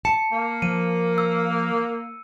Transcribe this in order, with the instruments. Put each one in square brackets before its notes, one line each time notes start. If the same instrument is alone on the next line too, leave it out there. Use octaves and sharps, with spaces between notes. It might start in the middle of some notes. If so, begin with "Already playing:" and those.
[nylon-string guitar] A5 [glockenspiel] C#7
[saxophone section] A#3
[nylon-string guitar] F3 [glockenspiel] D#7
[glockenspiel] E6